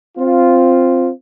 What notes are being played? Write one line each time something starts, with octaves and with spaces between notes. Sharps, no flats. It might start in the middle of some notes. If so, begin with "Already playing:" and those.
C4 F4